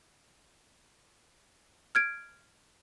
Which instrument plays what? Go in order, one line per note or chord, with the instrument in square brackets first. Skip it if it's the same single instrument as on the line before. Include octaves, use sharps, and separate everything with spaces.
[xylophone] F6 G#6 D7